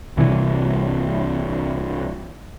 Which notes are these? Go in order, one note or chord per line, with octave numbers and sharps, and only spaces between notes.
C2 C3 E3